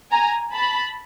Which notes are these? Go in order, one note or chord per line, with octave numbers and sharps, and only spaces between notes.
G#5 A#5
A5 B5